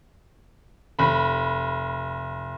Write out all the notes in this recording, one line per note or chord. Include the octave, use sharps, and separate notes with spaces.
F1 B5